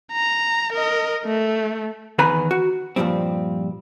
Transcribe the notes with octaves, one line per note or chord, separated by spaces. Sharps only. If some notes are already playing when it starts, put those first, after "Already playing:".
A#5
A#4 D#5
A3
E2 D#3 B4 G#5 A#5 B5
F#4
G2 A#2 F3 G3 C4